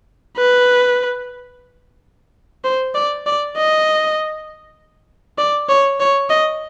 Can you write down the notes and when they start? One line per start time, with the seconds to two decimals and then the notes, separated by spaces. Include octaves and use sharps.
0.37 B4
2.64 C5
2.95 D5
3.26 D5
3.57 D#5
5.38 D5
5.69 C#5
6.00 C#5
6.30 D#5